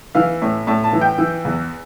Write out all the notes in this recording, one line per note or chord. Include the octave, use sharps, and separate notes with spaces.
E3 F5
A2
A2 A5
A5
E3
G5
E3
E2